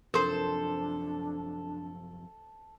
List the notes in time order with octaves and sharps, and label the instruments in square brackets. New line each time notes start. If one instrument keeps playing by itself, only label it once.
[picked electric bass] F#2 C3 F3 [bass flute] D4 [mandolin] A4 C5 [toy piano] A#4 C6